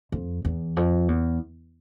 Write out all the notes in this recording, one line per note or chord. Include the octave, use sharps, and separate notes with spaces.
F2
E2
F2
E2